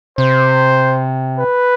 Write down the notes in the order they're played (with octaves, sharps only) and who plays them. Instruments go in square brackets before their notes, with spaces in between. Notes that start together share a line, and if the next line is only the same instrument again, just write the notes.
[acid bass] C3 [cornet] C5
[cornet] B4